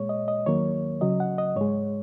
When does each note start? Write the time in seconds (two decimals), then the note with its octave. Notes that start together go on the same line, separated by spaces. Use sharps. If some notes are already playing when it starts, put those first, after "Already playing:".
Already playing: A#2 G#3 C#5
0.09 D#5
0.28 D#5
0.46 D#2 D#3 F#3 A#3 C#5
1.01 C#2 C#3 F#3 D#5
1.20 F#5
1.38 D#5
1.56 G#2 G#3 C#5